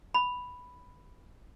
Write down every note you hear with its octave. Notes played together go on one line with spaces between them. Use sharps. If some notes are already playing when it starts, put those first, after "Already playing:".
B5